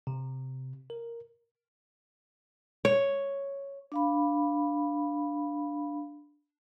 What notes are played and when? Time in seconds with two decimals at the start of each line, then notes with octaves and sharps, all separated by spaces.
0.07 C3
0.90 A#4
2.85 C#5
3.92 D4 F5 B5